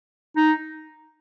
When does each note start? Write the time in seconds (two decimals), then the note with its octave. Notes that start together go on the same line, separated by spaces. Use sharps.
0.37 D#4